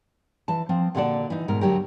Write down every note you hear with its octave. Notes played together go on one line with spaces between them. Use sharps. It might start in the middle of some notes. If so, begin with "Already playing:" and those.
E3 A5
F3 C4
A#2 D3 B3 F#4 A4 D5
E3 D#4
G#2 B2 A#4
D2 F#3 G4 A#4